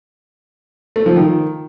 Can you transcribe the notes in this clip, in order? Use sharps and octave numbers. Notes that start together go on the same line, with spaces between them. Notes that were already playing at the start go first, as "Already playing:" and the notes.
A3
F3
D#3